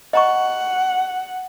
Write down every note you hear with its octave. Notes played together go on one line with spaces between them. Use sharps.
D#5 F#5 A#5 C#6